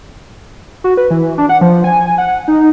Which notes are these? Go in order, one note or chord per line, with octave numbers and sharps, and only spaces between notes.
F#4
B4
E3
D4
F#5
F3
G#5
F#5
D#4